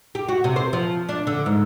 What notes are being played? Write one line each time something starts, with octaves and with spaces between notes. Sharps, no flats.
G4
F#4
C3
C5
F3
D4
D3
G#2